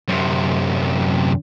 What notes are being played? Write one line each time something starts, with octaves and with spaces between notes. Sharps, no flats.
F#2 C3